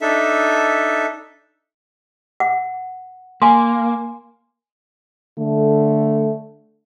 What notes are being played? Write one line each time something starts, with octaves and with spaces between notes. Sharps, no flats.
D4 D#4 A4 E5
F#5
A#3 G#5 C6
D3 A3